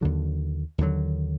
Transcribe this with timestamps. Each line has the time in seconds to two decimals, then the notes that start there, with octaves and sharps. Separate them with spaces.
0.01 D#2 D3 F#3
0.78 D#2 D3 F#3